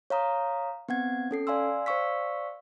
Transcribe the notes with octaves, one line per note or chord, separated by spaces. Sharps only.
C#5 F5 A#5 D#6
B3 C4 F#5 G#6
C#4 A4 C7
D5 F5 G#5 C6 E6
C5 D5 F5 C#6 E6 B6